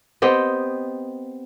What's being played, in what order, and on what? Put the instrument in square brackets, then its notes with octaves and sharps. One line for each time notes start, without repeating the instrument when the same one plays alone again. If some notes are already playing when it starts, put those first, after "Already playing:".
[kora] B3 C4 G4 D#5